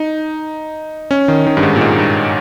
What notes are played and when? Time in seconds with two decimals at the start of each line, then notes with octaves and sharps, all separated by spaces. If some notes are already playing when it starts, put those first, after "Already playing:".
Already playing: D#4
1.11 C#4
1.28 D#3
1.47 D#3
1.57 G2
1.63 G#2
1.76 A#2
1.81 G#2
1.98 G2